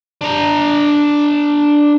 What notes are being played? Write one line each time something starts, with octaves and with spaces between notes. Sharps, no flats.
D4 A#5